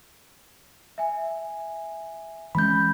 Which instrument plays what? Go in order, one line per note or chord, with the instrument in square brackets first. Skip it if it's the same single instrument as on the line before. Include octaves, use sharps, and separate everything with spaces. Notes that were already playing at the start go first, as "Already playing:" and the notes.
[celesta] E5 G#5
[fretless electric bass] E3 G#3 C#4 [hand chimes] B5 G6